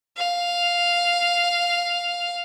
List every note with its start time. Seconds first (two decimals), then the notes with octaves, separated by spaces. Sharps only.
0.17 F5